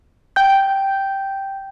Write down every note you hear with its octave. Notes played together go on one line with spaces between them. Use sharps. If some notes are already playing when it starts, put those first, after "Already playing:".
G5 G6